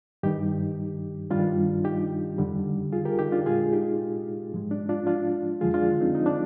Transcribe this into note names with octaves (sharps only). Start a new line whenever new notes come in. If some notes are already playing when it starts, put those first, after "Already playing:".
G2 D#3 G3 D#4 G4
G2 D#3 G3 D4 F4
D#4 G4
F2 D3 G3
F4 G#4
G4 A#4
D#4 G4
D4 F4
A#2 G#3 F4 G#4
D#4 G4
G#2 F3 G#3
D4
D4 F4
D4 F4
F2 D3 F3 G#3 F4 G#4
D4 F4
C4 D#4
D#4
D4